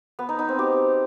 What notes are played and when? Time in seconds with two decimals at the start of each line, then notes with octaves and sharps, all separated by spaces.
0.19 B3
0.29 D#4
0.39 D#4
0.49 C4
0.59 G4